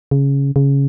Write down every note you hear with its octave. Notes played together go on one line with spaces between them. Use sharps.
C#3
C#3